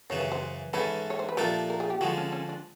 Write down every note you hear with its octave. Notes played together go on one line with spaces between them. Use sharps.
F#2 C#3 E3 C#5
C#5
C5
G#2 E3 A3 C#4 B4
C#5
C5
B4
A#2 F3 A3 D4 G4 A#4
A#4
G#4
G4
D3 F3 G#3 F#4
C#4
C#4
D4